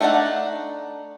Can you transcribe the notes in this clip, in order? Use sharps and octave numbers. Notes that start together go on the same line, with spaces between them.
A3 D4 D#4 D5 F#5